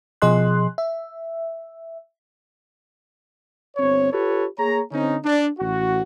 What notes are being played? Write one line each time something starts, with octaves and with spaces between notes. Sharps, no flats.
B2 F3 G#4 D#5 C6 F#6
E5
G1 C4 C#5
F4 G4 A4 B4 C#5
A#3 G#4 C#5 A#5
D3 C4 C#4 D#4
D4
A1 F#4